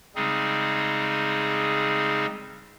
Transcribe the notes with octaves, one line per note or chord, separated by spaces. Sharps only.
C#3 G3 G#3 C4 D#4 G#4